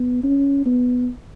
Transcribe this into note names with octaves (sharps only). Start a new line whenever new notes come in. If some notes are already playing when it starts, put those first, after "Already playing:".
Already playing: B3
C#4
B3